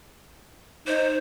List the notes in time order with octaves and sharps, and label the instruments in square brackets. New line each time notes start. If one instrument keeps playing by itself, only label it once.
[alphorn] D#4 [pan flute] C5